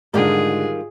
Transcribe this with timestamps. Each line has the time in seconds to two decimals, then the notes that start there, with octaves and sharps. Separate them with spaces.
0.14 G#2 D3 D#3 G3 F4 G#4